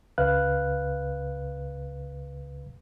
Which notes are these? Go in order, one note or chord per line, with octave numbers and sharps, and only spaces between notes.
C#2 C#3 B4 F5 F#6